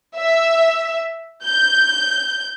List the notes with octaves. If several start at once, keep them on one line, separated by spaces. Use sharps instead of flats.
E5
G6